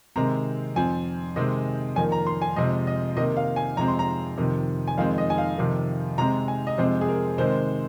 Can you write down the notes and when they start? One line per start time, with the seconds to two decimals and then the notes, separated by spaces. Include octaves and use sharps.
0.16 C3 D#3 G#3 C4 A#5
0.76 F2 F3 C4 G#5
1.36 C3 D#3 G#3 C4 D#5
1.96 F2 D#3 A#3 G#5
2.12 A#5
2.27 C6
2.42 G#5
2.56 F2 C3 G#3 C4 D#5
2.87 D#5
3.17 C3 D#3 A#3 D#5
3.37 F5
3.56 G#5
3.77 F2 C3 G#3 C4 A#5
3.88 C6
3.99 A#5
4.38 F2 C3 D#3
4.88 G#5
4.98 F2 D#3 G#3 C4 F5
5.18 D#5
5.30 G#5
5.38 F5
5.57 F2 C3 D#3
6.18 C3 G#3 C4 A#5
6.48 G#5
6.67 D#5
6.78 F2 C3 G#3 C4 C5
7.01 G#4
7.08 A#4
7.38 C3 D#3 G#3 C4 C5